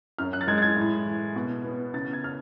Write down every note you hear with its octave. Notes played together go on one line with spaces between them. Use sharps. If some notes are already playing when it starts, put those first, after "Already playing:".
F#2 F6
F#6
A6
G#3 G#6
A6
G#6
A2
E3
B2
B3
C#3 A6
G#6
F6